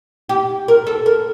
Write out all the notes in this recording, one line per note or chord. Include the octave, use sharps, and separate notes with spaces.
G4
A#4
A4
A#4